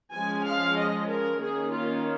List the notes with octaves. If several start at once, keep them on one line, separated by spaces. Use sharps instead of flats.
F3 G#3 C#4 G#5
F5
D#5
A#4
D#3 A#3 C#4 G#4
F4